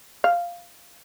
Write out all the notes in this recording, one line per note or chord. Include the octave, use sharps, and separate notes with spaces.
F5